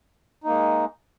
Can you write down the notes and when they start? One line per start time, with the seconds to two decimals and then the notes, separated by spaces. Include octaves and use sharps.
0.44 D#4
0.47 A#3
0.50 G#3